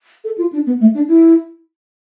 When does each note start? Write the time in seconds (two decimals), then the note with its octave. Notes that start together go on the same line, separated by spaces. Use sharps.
0.24 A4
0.38 F4
0.53 D4
0.66 B3
0.80 A3
0.94 D4
1.08 E4